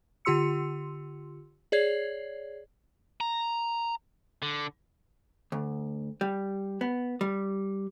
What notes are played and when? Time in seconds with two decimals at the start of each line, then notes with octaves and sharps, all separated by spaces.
0.25 D3 F4 G4 C6 E6 C#7
1.72 G#4 C#5 D5 G#6 C7
3.21 A#5
4.42 D3
5.52 D2
6.21 G3
6.81 B3
7.21 G3